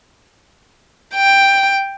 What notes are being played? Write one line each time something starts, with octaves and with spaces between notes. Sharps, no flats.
G5